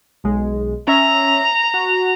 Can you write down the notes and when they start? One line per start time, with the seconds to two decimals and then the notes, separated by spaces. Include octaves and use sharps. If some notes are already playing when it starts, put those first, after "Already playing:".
0.24 B1 G#3
0.88 C#4 E5 A#5
1.74 F#4